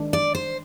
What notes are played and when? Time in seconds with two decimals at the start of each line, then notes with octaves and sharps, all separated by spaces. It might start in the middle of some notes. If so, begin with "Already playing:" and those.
Already playing: D#3 G#3 D4
0.13 D5
0.35 C5